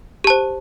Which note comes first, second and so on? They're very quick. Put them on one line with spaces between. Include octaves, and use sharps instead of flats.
G4 A5 C5